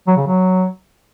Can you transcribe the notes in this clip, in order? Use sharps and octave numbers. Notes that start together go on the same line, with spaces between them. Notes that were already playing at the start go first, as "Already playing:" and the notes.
F#3
C#3
F#3